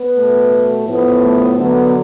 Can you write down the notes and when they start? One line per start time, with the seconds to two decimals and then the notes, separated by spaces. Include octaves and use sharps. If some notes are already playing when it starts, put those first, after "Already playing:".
Already playing: B3 B4
0.15 B2 A3
0.86 A2 F3 B3
1.23 A3 A4
1.58 D3 F#3 B3